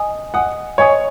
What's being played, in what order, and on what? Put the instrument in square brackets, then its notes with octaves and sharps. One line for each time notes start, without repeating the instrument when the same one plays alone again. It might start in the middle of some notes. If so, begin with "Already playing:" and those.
Already playing: [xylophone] D#5 G#5 D#6
[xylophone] D#5 G#5 D#6 [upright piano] F#5
[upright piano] C#5 [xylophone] D#5 G#5 D#6